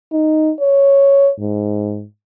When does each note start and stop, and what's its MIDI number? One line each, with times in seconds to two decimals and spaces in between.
0.12 0.51 63
0.60 1.31 73
1.39 2.05 44